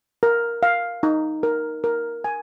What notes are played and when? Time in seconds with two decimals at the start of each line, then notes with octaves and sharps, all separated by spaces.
0.23 A#4
0.63 F5
1.03 D#4
1.43 A#4
1.84 A#4
2.24 G#5